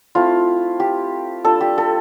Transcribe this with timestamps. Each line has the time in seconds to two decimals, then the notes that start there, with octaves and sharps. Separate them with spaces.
0.15 A3 C4 E4 F4
0.80 G4
1.44 G3 D4 F4 A4
1.61 G4
1.78 A4